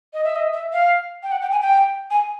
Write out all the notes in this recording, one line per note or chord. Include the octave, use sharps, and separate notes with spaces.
D#5
E5
D#5
E5
F5
G5
F#5
G5
G#5
G5
G#5